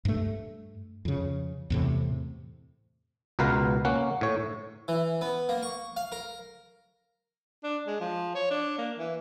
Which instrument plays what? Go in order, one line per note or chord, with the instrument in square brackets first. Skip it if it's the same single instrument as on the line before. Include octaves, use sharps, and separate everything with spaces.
[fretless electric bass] G2 A3
F2 C#3
E2 A2 C3
[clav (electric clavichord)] C#2 B2 A#4 B4 F5
A#3 C#4 F#5
A2 C#5
[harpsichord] E3
B3
A#3
C#6
F5
A#4
[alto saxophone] D4
G#3
F3
C#5
D4
A#3
E3